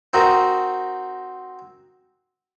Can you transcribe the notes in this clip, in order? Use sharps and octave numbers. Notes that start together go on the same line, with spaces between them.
C4 D#4 F#4 A#4